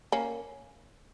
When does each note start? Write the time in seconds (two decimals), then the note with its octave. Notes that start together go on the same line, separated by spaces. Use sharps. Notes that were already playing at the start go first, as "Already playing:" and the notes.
0.12 A#3 C#4